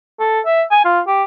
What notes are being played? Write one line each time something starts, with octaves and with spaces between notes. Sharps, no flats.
A4
E5
G#5
F4
G4